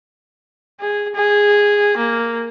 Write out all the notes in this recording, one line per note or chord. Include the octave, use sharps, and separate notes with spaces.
G#4
G#4
A#3